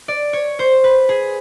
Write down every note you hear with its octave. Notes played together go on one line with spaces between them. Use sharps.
D5
C#5
C5
B4
G#4